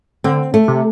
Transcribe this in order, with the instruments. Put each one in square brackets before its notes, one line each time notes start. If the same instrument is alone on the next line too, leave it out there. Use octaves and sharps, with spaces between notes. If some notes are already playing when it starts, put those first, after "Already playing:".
[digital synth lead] D3 [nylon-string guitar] C4
[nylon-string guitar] A3
[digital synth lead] C3